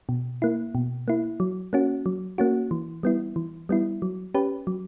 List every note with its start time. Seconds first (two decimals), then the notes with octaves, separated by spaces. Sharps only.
0.09 B2
0.42 A#3 E4
0.75 B2
1.08 A#3 E4
1.40 F#3
1.73 A#3 C#4 F#4
2.06 F#3
2.38 A#3 C#4 F#4
2.71 E3
3.03 G3 B3 E4
3.36 E3
3.69 G3 B3 E4
4.02 F#3
4.35 C#4 G4 B4
4.67 F#3